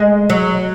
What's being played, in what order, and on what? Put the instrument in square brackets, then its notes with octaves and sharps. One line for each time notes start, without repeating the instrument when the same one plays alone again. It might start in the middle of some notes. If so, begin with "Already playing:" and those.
Already playing: [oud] G#3
F#3